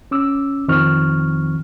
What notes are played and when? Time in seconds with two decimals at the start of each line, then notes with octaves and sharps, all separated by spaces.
0.11 C#4 D6 E6
0.68 F2 D#3 F3 C4 C#6 F6